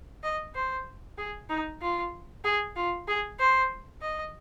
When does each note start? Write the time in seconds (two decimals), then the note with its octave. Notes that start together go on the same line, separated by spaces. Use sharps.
0.23 D#5
0.55 C5
1.18 G#4
1.49 D#4
1.81 F4
2.44 G#4
2.76 F4
3.08 G#4
3.40 C5
4.02 D#5